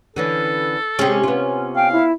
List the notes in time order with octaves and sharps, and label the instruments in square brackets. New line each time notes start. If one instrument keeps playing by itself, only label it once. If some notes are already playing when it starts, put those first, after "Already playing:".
[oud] D3 E3 C#4 [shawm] A4
[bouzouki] C3 C#4 [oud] G#3 G4
[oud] B3 F4
[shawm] F5 [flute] G5
[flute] E4